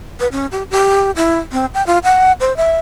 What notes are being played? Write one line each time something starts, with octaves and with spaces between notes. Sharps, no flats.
B4
C#4
G4
G4
E4
C4
G5
F4
F#5
C5
E5